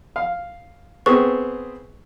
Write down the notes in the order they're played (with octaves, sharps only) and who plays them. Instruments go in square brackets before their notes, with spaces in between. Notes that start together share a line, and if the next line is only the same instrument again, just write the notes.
[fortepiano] F5
[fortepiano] B3 C4 G#4 [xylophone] C#6